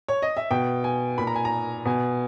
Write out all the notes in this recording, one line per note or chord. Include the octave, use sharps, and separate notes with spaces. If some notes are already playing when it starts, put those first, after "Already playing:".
C#5
D#5
E5
B2 G5
G#5
A#2 B5
A#5
G#5
A#5
B2 G#5